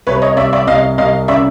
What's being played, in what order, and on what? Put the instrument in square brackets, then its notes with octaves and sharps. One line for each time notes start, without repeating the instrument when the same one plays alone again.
[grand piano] C2 [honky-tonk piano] B4 C#5
[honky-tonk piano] C#5 D#5
[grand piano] C2 [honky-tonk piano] D5 E5
[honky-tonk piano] D5 E5
[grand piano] C2 [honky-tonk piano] D#5 F5
[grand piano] C2 [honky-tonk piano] D#5 F5
[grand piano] C#3 [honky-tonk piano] D5 E5